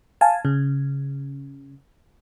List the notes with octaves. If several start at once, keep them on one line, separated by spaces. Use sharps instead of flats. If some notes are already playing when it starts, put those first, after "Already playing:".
F5 G#5 A5
C#3